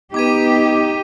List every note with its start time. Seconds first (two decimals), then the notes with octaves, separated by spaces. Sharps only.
0.14 B3 D#4 G4 B4 D6 G#6 D#7